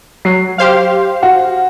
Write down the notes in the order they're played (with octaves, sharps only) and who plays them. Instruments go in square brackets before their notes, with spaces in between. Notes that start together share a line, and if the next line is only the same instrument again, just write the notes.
[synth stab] F#3 [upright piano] C7
[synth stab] G4 C5 F5
[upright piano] F#4